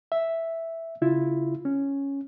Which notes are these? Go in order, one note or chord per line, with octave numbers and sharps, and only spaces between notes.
E5
C#3 E4 F4
C#4